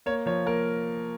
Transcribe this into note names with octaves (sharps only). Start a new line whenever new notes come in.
A#3 C#5
F3 C#5
A#3 A#4